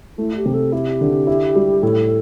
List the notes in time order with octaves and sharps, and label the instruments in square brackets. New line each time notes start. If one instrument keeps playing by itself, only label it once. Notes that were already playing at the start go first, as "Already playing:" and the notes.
[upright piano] A3 [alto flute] E4
[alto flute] G4
[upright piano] C3
[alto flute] A4
[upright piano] E4 [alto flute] G4
[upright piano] D3
E4
G3
[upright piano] A2 [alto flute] A4